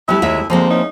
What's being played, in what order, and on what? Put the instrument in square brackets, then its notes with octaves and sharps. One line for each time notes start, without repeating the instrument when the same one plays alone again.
[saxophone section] D2 E4 [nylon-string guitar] G3 B3
[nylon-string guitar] D#2 G#3 E5
[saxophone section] D2 D3 G#3 [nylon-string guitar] F3 A#3 C4
[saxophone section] E2 C#4 D#4